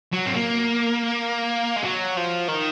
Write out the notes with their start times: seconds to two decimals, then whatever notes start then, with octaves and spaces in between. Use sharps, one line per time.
0.13 F#3
0.26 C4
0.34 A#3
1.77 G#3
1.84 F#3
2.17 F3
2.48 D#3